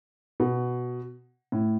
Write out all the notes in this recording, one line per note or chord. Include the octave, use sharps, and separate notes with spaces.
B2
A2